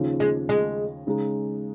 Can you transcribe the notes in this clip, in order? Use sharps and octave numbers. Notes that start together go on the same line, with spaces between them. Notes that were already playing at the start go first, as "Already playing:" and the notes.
Already playing: D#2 C#3 F3
G#3
G#3
C#3 G#3 D#4